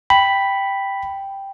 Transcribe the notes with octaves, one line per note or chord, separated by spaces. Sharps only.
G5 B5